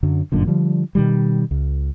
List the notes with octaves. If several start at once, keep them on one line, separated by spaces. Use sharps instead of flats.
F#2 D3 F#3
G1 F#2 A#2 D3
D3 F3 G3
B2 D#3 G3
C#2